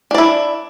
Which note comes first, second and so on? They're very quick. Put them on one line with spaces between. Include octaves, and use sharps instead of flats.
D4 D5 E4